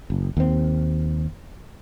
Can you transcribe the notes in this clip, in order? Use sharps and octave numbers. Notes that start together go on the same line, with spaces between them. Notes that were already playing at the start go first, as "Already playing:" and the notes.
F#1
D#2 C4